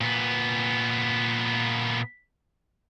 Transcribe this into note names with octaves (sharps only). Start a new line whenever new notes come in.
A#2 B3